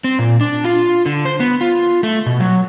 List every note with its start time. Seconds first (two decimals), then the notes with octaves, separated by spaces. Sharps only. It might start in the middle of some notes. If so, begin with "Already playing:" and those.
0.04 C4
0.19 A#2
0.41 D4
0.64 F4
1.06 D3
1.25 C5
1.40 B3
1.61 F4
2.03 A3
2.26 B2
2.40 F#3